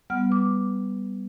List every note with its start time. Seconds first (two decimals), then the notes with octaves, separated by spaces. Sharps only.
0.10 G3 B3 F#5 F6
0.29 B4 D6